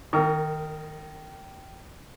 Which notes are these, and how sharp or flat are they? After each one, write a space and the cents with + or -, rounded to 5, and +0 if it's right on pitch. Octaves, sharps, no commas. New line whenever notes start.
D#3 +0 A#4 -35 C#6 +30